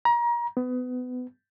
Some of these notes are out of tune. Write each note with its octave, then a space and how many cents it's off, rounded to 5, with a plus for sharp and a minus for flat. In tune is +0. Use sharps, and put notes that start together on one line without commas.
A#5 +30
B3 +25